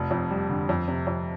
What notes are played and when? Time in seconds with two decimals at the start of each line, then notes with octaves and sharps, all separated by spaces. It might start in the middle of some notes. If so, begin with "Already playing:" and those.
Already playing: F1
0.11 F2
0.30 G3
0.49 D3
0.69 F2
0.88 C3
1.07 F2